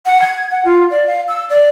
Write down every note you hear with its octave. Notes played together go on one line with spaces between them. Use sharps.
F#5
G#6
F#5
F4
D5
F5
E6
D5